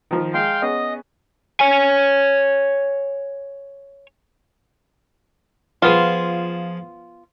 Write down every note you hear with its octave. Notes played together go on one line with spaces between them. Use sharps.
D#3 F3
G#3 F5 G5 C6
B3 C#4 G#4 D#5
C#5 G#5
F3 B3 F4 G#4